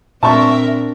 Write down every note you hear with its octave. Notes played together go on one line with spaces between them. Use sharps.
A#2 C4 D4 A#4 E5 A5 C#6